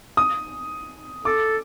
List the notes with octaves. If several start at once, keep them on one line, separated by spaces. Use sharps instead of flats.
D#6
A4 D6